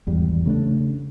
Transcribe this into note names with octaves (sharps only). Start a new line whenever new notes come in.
G#1 E2 G3
C#3 A3 A#3 D4